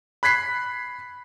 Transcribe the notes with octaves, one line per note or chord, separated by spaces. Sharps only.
B5 F#6 G#6 B6 C7